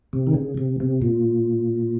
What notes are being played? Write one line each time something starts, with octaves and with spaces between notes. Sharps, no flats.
C3
D#3
C#3
C3
C3
A#2